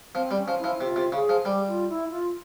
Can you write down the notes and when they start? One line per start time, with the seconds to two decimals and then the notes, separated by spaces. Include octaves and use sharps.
0.15 F3 C4
0.31 G3
0.37 C#4
0.48 F3
0.59 E4
0.64 F3
0.81 C3 F4
0.96 C3
1.12 C#3 G#4
1.29 F3
1.45 G3 G4
1.67 F4
1.88 E4
2.10 F4